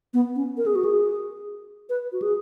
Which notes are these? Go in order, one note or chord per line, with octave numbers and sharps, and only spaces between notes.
B3
C#4
A#4
G#4
F#4
G#4
B4
F#4
G#4